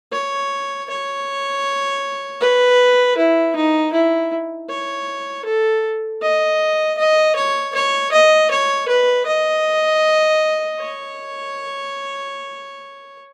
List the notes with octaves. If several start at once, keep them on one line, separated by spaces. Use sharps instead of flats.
C#5
C#5
B4
E4
D#4
E4
C#5
A4
D#5
D#5
C#5
C#5
D#5
C#5
B4
D#5
C#5